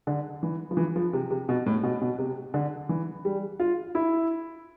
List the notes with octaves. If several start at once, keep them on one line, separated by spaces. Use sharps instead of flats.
D3
E3
F3
E3
F3
C3
C3
B2
A2
B2
B2
C3
D3
E3
G3
F4
E4